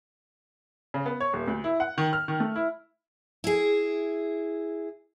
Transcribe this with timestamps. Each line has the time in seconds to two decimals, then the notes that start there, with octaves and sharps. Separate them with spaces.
0.94 C#3
1.06 B3
1.20 C#5
1.33 D#1
1.48 D2
1.64 E4
1.80 F#5
1.98 D#3
2.13 F6
2.28 D#3
2.40 A3
2.56 E4
3.44 E4 G#4